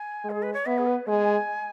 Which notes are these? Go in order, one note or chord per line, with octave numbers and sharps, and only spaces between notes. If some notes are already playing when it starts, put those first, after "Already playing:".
Already playing: G#5
G#3
G#4
B4
C#5
B3 E5
G#4
B4
G#3 G#5